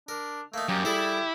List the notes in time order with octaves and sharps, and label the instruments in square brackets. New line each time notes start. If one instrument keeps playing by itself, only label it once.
[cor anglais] D4 [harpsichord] A#4
[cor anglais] A3 [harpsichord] A#3 D#4
[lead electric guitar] F#2 [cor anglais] G4
[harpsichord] G3 G#4 A4 [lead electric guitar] E4